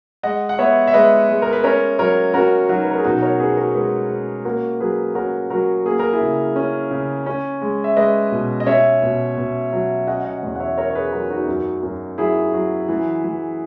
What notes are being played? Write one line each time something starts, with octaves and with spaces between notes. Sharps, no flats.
G#3 D#5 F#5
F#5
B3 C#5 E5
E5
G#3 B4 D#5
G#3
A#4
B4
C#4 A#4 C#5
F#3 A#4 C#5
C#4 F#4 A#4
F#3 D#4 F#4
B4
A#4
G#4
B2 D#4 F#4
A#4 C#5
C#4 G#4 B4
F#4 A#4
G#3 G#4 B4
C#4
A#3 F#4 A#4
F#3 G#4 B4
C#4 F#4 A#4
F#3 F#4 A#4
A#3 G#4
A#4
E4 G#4
C#3
C#4
C#3
C#4
G#3
E5
G#3 B4 D#5
B2
D#5
C#4 C#5 E5
B2
B2
F#3
C#4 D#5 F#5
D#5 F#5
E2
F#5
C#5 E5
C#4 A#4 C#5
C#5
G#4 B4
F#3 F#4 A#4
D#4 F#4
F#2
F#2
F#3 E4 G#4
F#3
E3
E3